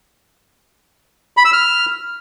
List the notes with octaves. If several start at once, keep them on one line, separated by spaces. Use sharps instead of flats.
B5
E6
F6